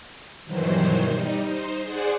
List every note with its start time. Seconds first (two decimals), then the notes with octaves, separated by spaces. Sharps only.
0.45 G2 B2 D#3 E3 F#3 C5
1.06 G3 D#4
1.44 D#4 C5
1.83 G#4 C5 D5 F#5